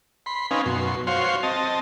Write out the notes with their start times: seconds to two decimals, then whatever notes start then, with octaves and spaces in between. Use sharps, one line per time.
0.26 B5 C6
0.51 C4 C#4 D#4 B4 F5 G#5
0.66 F#2 B2 C6
1.07 F#4 C5 C#5 F5 C6
1.43 C4 D#5 A5